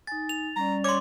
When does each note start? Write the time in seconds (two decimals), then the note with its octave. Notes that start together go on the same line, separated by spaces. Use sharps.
0.07 D#4 G#5 A6
0.29 F7
0.56 G3 C#4 D5 A#5
0.84 C#5 C6 D6